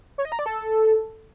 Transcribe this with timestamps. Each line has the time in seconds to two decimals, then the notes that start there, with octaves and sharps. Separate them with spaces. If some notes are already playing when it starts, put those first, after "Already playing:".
0.18 C#5
0.25 D#5
0.32 A#5
0.39 D5
0.46 A4